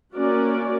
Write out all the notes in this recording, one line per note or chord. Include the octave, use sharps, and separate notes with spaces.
A#3 C#4 F#4 A#4 D5